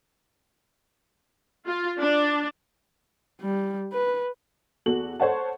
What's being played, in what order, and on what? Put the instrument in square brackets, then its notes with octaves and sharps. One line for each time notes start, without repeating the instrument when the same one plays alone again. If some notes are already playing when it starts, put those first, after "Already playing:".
[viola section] F4
D4
[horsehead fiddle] G3
B4
[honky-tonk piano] E2 F#4 A4 F#7
A4 C5 C#5 F#5 A5